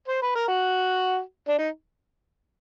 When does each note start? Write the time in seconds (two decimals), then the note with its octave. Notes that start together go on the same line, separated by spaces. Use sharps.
0.08 C5
0.23 B4
0.36 A#4
0.48 F#4
1.48 D4
1.59 D#4